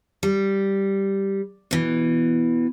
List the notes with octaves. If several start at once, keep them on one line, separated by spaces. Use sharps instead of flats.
G3
B2 E3